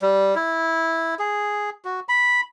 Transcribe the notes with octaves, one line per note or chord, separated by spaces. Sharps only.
G3
E4
G#4
F#4
B5